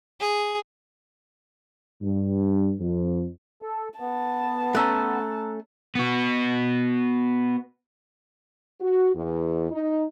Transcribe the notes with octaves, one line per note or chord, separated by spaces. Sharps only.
G#4
G2
F2
A4
B3 A5
A3 C#4 A#5 E6 F#6
B3 F#4
F#4
E2
D#4